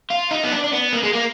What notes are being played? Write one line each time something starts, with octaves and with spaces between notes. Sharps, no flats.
F4
D#4
B3
D4
D4
B3
A#3
G#3
A#3